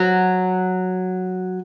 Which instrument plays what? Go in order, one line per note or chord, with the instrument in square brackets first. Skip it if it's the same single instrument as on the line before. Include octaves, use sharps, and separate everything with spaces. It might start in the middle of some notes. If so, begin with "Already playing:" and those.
Already playing: [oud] F#3